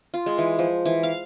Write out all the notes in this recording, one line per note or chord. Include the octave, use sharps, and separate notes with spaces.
F4
G#3
E3
F3
E3
F5